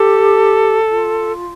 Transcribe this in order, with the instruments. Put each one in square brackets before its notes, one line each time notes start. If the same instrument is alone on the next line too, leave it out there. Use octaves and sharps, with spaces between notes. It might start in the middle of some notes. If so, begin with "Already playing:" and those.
Already playing: [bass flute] G4 [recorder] A4
[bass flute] F4